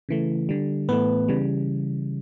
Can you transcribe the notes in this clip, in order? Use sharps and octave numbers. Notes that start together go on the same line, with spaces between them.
C#3 E3 A3
D3 G3
A2 E3 A3 B3 B4
C#3 E3 G3